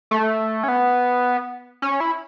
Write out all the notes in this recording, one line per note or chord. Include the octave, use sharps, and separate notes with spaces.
A3
C#4
B3
C#4
E4